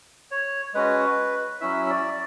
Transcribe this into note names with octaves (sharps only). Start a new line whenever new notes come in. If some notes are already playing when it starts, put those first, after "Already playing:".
C#5
G#3 C#4 F#4 B4
F#3 C#4 E4 E5
E5
D5